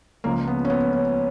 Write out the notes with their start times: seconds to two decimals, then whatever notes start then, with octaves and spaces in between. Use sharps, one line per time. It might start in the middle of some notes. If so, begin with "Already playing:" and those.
0.24 C#2 C#3 F3 A#3
0.47 B3
0.65 C#4
0.70 B3
0.93 C#4